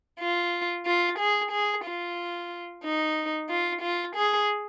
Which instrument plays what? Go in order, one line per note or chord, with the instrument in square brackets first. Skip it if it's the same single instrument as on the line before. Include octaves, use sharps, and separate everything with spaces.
[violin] F4
F4
G#4
G#4
F4
D#4
F4
F4
G#4